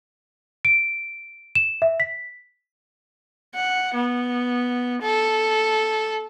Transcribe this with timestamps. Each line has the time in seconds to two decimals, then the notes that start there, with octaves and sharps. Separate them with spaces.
0.65 D7
1.55 E7
1.82 E5
2.00 B6
3.55 F#5
3.94 B3
5.02 A4